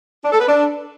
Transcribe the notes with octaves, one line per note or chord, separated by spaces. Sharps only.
D4
A4
B4
D4